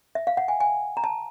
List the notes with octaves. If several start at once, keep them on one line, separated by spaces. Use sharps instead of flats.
E5
F5
F#5
G#5
G#5
A#5
A5